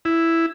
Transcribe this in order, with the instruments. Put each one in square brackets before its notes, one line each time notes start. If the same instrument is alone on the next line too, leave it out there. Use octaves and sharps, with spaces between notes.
[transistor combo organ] E4